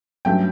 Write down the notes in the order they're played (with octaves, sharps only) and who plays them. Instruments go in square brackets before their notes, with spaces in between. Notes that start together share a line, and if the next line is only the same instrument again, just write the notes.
[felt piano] G2 F#3 A3 C#4 G5